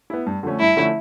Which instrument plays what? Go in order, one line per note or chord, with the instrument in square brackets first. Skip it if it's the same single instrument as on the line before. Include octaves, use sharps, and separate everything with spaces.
[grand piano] B3 E4
G2
D3 F3 A3 C#4
[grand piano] G2 [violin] E4
[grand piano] D3 F3 A3 C#4